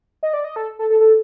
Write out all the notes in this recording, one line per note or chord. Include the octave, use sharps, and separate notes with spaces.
D#5
D5
D#5
A4
A4
A4
A4